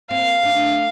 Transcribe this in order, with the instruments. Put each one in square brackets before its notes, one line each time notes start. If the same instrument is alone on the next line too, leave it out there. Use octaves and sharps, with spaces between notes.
[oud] A#3 C4 [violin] F5
[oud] A3 D4